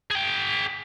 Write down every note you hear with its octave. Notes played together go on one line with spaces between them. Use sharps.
G#4 G5